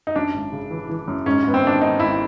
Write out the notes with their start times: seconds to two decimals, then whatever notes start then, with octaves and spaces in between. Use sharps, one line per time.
0.07 D#4
0.16 F#2 D4
0.34 G#1
0.52 C#3
0.71 E3
0.90 E3
1.08 F#2
1.26 G#2 C#4
1.44 G#2 B3
1.54 C4
1.63 D#3 D4
1.81 D#3 D#4
2.00 G#1 E4